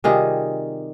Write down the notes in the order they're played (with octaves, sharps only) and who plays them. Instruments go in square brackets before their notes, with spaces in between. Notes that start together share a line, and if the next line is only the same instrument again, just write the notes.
[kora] C3 D#3 G3 F4 G#4